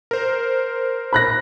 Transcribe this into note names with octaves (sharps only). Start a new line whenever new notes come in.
A#4 C5
B5 F#6 A#6